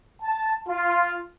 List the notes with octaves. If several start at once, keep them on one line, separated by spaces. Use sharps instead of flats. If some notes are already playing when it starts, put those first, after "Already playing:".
A5
F4